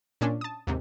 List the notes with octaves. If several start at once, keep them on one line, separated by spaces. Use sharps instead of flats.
A#2 C#4 D4
A5 D#6
D#2 G#2 C3